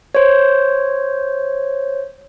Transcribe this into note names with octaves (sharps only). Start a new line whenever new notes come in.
C5 C#5